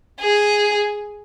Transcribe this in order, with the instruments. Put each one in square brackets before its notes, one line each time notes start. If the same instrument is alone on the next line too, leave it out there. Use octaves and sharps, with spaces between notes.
[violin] G#4